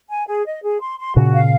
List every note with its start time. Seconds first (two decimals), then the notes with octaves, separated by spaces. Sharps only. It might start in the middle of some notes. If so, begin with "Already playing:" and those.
0.08 G#5
0.27 G#4
0.45 D#5
0.63 G#4
0.80 C6
0.99 C6
1.16 A#2 C#3 F#4
1.34 F5